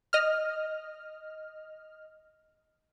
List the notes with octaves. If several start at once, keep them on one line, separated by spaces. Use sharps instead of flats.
D#5 F6